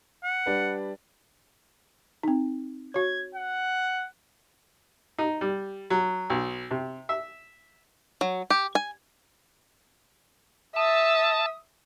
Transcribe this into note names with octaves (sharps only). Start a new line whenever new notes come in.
F#5
G3 D4 B4
C4 D#4
F#4 C#5 G#6
F#5
D#4
G3
F#3
B1
C3
E5
F#3
G4
G#5
E5 A5 D#6